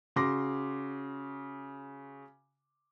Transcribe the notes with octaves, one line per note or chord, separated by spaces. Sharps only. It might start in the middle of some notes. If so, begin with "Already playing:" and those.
C#3 F#4 C6 D6 A#6